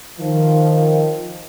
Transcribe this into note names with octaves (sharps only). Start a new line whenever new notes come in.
D#3 F3